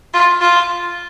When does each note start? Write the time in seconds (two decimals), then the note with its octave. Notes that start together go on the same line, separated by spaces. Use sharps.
0.14 F4
0.41 F4